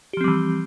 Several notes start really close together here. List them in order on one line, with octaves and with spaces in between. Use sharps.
G4 F3 C4 G3 E3